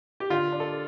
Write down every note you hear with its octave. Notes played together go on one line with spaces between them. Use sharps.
G4
D3 F4
D4
A4